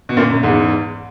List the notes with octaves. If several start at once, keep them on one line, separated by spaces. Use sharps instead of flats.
B2
F#2 A#2
F#2
E2 G#2